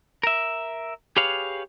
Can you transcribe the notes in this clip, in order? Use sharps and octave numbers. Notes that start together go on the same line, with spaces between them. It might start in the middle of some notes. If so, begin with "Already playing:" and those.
A#4 E5
G4 G#4 B4 C#5 F5